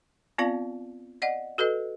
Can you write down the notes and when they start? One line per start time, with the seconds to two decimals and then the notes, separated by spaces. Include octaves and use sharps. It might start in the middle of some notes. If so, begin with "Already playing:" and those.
0.38 B3 C4 F4 D5 F5 A5
1.22 D5 D#5 F#5
1.58 F#4 A4 B4 D#5